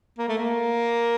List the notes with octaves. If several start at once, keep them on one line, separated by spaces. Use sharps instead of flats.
A#3
A3
A#3